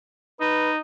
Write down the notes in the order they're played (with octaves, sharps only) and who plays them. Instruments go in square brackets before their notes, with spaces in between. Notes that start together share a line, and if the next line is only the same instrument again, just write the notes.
[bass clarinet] D#4 [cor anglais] B4